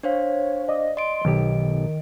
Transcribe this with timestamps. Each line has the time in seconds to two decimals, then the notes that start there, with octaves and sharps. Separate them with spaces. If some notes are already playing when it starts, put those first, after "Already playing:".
0.03 D4 C5 C#5 F5
0.69 D5 D#5
0.97 D#5 C6 D7
1.25 B1 D#3 G4